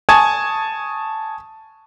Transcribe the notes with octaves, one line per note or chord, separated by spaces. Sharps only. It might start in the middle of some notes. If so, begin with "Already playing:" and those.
G#5 A5 C#6 D#6 G#6